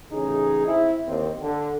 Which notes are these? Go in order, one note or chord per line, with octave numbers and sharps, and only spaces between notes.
A1 C#3 D#4 G#4
C4 E4
D#2 C4
D3